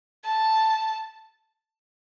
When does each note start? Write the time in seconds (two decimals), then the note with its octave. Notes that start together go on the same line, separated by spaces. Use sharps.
0.24 A5